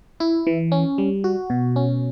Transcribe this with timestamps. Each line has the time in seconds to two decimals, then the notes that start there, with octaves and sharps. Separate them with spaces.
0.20 E4
0.47 E3
0.72 C#4
0.98 G3
1.24 F#4
1.50 B2
1.76 C#4